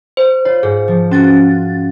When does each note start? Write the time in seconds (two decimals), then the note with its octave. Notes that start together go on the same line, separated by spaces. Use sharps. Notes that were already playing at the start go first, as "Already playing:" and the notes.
0.17 C5
0.45 F4 C#5
0.63 G#2 G#4
0.88 F3
1.11 C#4 F4 F#4 A6